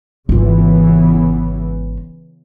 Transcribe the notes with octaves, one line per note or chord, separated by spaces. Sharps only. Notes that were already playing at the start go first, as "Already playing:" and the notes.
G#1 C#3 E3 B3 F4